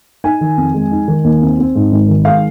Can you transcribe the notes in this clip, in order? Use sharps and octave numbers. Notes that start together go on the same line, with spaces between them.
D#4 G#5
D#3
F2
G#3
D#4
D#3
D#2
C4
C4
G#2
G#1
D#3
G#3 F5